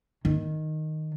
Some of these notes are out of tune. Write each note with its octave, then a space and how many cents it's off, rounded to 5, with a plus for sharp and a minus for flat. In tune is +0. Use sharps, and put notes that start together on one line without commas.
D#3 +0